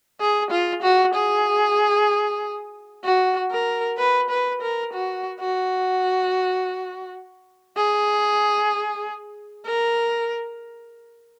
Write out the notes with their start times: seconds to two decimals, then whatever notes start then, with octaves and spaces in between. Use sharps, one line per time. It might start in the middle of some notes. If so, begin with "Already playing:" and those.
0.20 G#4
0.51 F4
0.83 F#4
1.14 G#4
3.04 F#4
3.51 A#4
3.98 B4
4.30 B4
4.62 A#4
4.93 F#4
5.40 F#4
7.77 G#4
9.66 A#4